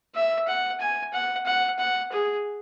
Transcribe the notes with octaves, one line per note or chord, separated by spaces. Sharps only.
E5
F#5
G#5
F#5
F#5
F#5
G#4